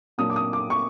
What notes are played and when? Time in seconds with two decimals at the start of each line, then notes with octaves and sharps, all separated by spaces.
0.18 A#2 F#3 A#3 D4 D#6
0.30 D6
0.36 D#6
0.53 D6
0.70 C#6